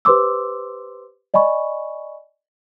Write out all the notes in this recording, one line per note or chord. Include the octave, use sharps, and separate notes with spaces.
G4 B4 C5 C6 D6 E6
D5 D#5 G#5 B5 C#6